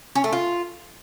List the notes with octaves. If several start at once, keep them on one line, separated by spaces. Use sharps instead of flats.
C#4
A3
F4